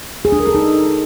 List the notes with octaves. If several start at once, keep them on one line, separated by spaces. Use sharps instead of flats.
G#4
D4
A#4
A4
D#4